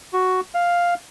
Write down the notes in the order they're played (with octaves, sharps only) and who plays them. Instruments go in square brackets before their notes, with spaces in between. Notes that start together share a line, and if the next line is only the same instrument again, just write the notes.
[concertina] F#4
F5